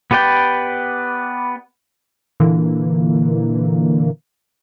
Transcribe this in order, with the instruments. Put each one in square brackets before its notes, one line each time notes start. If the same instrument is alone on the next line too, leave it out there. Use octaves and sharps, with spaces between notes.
[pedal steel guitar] B3 G4 B4 D5 G5
[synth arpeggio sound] A#2 D3 E3 A#3